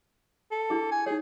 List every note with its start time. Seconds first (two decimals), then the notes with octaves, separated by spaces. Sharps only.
0.51 A4
0.70 D4 E4 G#4
0.92 G#5
1.06 D#4 G#4 C#5